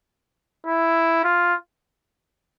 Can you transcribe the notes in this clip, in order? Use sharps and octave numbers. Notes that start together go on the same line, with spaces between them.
E4
F4